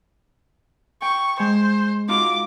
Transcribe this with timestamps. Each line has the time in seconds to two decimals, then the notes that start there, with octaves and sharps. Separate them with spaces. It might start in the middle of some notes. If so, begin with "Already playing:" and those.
1.02 G5 C#6
1.39 G#3 C5
2.08 D#4 F4 F#4 D6